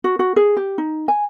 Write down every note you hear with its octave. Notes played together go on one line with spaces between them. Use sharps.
F#4
F#4
G#4
G4
D#4
G#5